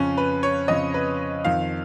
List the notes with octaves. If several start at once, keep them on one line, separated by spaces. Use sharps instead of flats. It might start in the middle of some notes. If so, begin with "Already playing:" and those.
Already playing: F2 C#3 C#4
B4
C#5
F2 C#3 D#5
B4
F2 D#3 F5